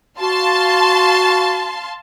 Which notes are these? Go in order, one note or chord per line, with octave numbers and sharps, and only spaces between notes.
F#4 F5 A5 C6